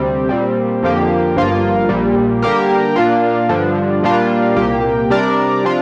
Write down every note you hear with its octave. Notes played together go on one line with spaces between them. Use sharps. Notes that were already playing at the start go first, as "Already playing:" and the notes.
Already playing: D2 C3 G3 C4
A#2 G3 C4
F2 D3 F3 A#3 G4
G1 G2 F3 A#3 F4
A#1 A#2 G3
D3 G3 A#3 G4 A#4
A#2 A#3 D4 F4
G2 D3 F3 D4
A#2 G3 A#3 D4 F4
C2 A#2 A#3 G4
C3 G3 D4 A#4 D5
C3 F3 D4 F4